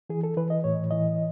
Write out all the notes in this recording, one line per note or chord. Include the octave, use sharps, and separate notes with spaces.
E3 G#4
A4
E3 B4
D#5
A2 C#5
E3 D#5